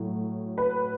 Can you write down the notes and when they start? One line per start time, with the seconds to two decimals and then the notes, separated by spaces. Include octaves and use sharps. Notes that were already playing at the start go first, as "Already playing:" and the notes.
Already playing: A2 F#3
0.58 B4